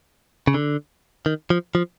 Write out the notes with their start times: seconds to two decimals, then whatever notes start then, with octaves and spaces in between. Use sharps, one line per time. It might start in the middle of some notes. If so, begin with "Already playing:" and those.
0.47 C#3
0.54 D3
1.26 D#3
1.50 F3
1.75 F3